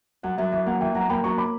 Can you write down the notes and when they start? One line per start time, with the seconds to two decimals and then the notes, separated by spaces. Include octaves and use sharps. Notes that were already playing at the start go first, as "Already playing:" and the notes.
0.23 F#2 F#5
0.38 F#2 E5
0.52 E3 E5
0.66 A#3 F#5
0.81 E3 E5 G5
0.95 F#2 F#5 A#5
1.10 A#3 G5 B5
1.24 F#2 A#5 C#6
1.38 B5 D6